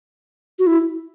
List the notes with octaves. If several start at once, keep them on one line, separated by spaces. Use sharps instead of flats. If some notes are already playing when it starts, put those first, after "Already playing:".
F#4
E4